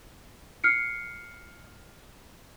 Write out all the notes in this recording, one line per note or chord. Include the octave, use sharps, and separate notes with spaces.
F6 C7 C#7